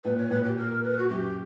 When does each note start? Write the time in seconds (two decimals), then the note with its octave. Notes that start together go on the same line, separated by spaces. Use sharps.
0.05 A#2 B4
0.18 C#5
0.30 A#2 B4
0.44 G4
0.57 A#4
0.83 B4
0.98 F#4
1.09 F#2 G4